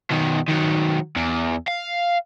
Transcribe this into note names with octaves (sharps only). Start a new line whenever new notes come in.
B2 D#3
D#3 F#3
E2
F5